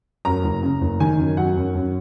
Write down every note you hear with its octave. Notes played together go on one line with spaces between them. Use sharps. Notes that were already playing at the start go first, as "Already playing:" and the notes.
F#2 A#5
F#1
C#3
F#1
D#3 G#5
F#2
F#3 F#5
F#2
F#2